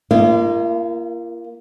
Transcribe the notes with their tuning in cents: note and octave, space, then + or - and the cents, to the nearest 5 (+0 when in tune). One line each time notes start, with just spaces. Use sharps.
A#3 +0 F4 -45 D#5 +0